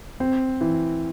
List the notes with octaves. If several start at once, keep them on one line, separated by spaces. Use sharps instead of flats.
C4
E3